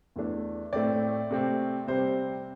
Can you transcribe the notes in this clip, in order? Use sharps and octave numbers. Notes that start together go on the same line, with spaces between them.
E2 E3 A3 D4
A2 A3 C4 D5
C3 A3 C4
C3 G3 C4 C5